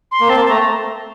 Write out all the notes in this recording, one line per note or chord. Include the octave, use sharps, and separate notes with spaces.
C6
A#3
C4 A5
A#3
A3 A#5